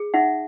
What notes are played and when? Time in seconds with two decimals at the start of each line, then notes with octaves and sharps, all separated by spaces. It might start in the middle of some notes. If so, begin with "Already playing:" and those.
Already playing: G#4
0.14 D#4 E5 F#5